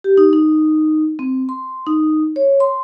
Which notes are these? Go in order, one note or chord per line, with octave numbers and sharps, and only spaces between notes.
G4
D#4
D#4
C4
C6
D#4
C#5
C6